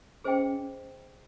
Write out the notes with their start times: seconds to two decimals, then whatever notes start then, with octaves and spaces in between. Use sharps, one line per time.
0.24 C#4 G#4 C5 D#5 G5